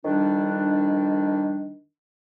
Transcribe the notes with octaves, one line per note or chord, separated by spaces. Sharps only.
F2 D#3 G3 D4